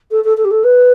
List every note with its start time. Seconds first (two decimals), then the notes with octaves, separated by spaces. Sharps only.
0.11 A4
0.24 A4
0.37 A4
0.44 G4
0.51 A4
0.64 B4